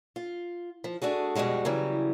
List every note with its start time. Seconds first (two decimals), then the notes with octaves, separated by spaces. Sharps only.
0.16 F4
0.84 F3
1.02 A3 D4 F#4 G#4
1.35 F2 B2 G3 G#3 F#4
1.65 C#3 E3 F#3 G3